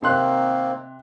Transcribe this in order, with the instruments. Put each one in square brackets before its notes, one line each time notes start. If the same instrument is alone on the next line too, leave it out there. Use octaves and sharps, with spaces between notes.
[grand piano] C3 C6 F#6 [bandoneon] D#3 A#3 C4